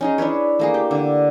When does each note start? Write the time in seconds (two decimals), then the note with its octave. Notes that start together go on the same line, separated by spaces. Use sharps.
0.01 C#4 D#4 G#4
0.18 D4 E4 B4 C#5
0.59 A3 A#3 G#4
0.74 G4
0.91 D3 D4